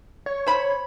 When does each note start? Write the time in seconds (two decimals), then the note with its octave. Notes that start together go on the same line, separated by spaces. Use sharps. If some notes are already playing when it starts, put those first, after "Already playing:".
0.26 C#5
0.46 C5 B5